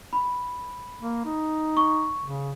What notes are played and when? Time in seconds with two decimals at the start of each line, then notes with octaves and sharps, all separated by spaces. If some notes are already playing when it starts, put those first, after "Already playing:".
0.13 B5
0.98 A#3
1.26 D#4
1.77 C#6
2.23 C#3